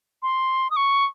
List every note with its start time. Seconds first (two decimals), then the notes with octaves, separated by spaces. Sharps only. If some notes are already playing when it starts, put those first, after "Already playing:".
0.22 C6
0.71 D#6
0.76 C#6